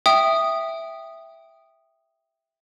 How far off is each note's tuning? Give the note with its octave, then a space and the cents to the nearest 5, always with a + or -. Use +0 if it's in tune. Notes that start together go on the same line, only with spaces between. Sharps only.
E5 +0 G5 +0 D#6 -10